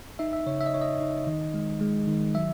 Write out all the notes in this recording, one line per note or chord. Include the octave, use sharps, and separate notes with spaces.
D#4 E5
E5
C#3 C#5
E5
D#5
D#4 C#5
D#5
D#4
D#3 D#5
G#3
G#3
D#3
F#3 E5